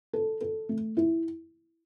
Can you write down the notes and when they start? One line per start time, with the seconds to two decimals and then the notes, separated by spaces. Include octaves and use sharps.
0.13 A4
0.41 A4
0.69 A3
0.97 E4